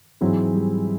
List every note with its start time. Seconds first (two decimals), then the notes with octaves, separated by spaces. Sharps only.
0.21 G#2 E3 F#3 G#3 C4 E4
0.54 G3